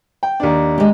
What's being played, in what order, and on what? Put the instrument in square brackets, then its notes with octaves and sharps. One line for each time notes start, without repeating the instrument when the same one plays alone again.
[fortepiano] G5
D#2 D4
[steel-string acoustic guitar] G#3 G4